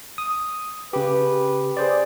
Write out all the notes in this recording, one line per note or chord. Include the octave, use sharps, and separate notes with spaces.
D#6
C#3 G4 B4
G#4 C5 D5